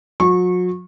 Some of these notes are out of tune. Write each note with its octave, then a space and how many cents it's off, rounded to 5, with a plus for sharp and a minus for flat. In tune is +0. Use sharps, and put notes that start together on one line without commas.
F#3 -40 C#6 -20